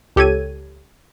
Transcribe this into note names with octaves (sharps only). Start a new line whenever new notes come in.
C#2 G4 A4 C#5 G#6 D#7